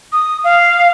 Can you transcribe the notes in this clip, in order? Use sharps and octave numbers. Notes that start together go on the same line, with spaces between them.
D#6
F5